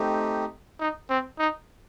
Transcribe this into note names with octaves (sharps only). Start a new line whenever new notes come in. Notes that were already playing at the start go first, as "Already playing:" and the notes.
Already playing: A3 C4 D#4 G4
D#4
C4
D#4